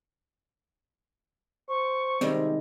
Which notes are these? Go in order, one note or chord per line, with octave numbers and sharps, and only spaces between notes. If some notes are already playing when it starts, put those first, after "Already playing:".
C5 C#6
C3 D#3 G3 G#3 C4